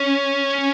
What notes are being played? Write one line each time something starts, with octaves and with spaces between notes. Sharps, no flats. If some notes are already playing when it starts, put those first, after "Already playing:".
Already playing: C#4